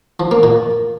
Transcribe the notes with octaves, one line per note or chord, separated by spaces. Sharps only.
F3
A#3
A#2